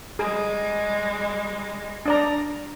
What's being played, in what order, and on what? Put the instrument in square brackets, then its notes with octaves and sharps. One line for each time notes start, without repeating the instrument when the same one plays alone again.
[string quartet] G3 G#3 [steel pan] G#4
[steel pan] D4 D5 A#5